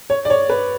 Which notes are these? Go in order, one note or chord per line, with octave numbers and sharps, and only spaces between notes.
C#5
D5
C#5
B4